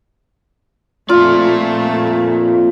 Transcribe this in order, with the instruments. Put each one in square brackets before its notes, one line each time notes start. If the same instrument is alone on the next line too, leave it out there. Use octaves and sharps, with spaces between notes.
[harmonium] F2 [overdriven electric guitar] A#2 D5 [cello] A3 [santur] F4